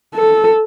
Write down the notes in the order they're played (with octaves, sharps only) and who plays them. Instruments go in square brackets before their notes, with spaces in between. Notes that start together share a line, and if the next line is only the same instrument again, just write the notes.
[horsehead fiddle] A4